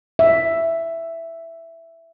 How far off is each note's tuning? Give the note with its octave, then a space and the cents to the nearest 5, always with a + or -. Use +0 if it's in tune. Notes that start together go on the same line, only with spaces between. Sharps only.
E5 +5